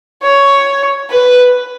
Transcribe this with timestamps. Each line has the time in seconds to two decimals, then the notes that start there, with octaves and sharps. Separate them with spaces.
0.23 C#5
1.10 B4